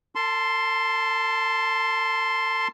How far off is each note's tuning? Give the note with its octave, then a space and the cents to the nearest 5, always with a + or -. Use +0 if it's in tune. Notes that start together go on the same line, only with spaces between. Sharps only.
A4 +45 A5 +0 C6 +0